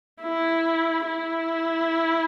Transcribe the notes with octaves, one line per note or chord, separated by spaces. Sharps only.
E4
E4